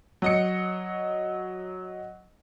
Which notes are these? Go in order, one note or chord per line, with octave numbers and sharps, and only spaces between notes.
F#3 D#5 C#7